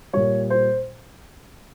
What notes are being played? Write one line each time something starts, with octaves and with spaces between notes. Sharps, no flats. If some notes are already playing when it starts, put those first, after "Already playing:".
A#2 G3 C#5
C5